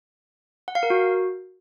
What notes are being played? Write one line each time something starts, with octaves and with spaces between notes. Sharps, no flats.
F#5
F5
A#4
F#4